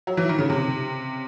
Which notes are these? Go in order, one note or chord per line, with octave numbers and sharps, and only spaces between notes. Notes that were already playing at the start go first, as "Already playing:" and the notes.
F#3
E3
D#3
C#3
C3